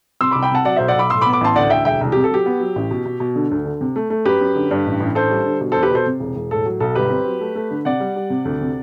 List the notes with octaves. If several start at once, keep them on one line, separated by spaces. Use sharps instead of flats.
C3 C6 E6
C2 B5 D6
G5 B5
C3 F#5 A5
F#3 D5 F#5
B1 C5 E5
D5 F#5
B1 B5 D6
A2 C6 E6
B5 D6
B3
B5 D6
A1 A5 C6
D2 D5 F#5
D2 E5 G5
E1 E5 G5
C2
C3 G4
A4
F#3 G4
B3
F#3
A1
B2
B2
B2
D3
D2
D3
C3
A3
A3
F#2 G4 B4
F#2
D3
G2
A1
A1
D4 A4 C5
G3
D3
B2
E2 A4 C5
G4 B4
B2 A4 C5
C3
E1
E1
A2 A4
F#3
B1 A4
G1 G4 B4
C4
F#3
A3
A3
D3
C3 D5 F#5
G3
G3
C3
D2
C3